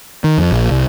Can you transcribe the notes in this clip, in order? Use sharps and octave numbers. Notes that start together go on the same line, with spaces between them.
D#3
F2
A#1
C2